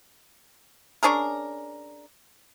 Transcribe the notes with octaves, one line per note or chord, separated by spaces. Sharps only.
C#4 D4 G#4 A#4